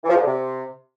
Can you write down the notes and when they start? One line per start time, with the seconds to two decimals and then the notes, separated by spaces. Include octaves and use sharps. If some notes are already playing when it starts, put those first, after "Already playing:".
0.04 E3
0.09 F3
0.15 G#2
0.21 D3
0.26 C3